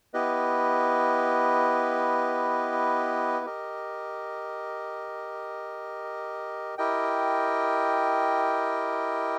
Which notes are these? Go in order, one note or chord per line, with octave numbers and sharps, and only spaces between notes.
B3 E4 G4 B4 D#5
G4 A#4 D#5
E4 G4 A#4 D#5 G5